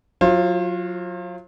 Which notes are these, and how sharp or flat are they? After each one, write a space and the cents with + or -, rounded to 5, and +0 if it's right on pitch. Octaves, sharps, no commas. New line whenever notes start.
F#3 -25 F4 -10 C5 +40